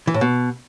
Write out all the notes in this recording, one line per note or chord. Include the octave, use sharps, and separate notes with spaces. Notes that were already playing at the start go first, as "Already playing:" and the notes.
E3
A2
B2